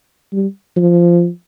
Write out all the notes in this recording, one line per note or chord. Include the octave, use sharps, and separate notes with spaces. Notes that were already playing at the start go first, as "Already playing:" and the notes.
G3
F3